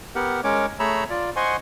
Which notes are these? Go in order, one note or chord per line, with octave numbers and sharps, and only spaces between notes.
B3 G4 A#4 F#5
G#3 C#4 A#4 C#5 D6
A3 G#4 C#5 A#5 B5 E6
F4 D5
C5 D#5 F#5 G#5 C6 C#6